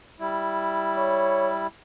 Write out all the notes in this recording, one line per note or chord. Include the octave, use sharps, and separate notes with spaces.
G3 E4
C#5